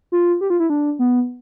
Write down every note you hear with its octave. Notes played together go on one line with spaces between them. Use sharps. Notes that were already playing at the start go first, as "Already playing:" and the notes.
F4
G4
F4
E4
D4
B3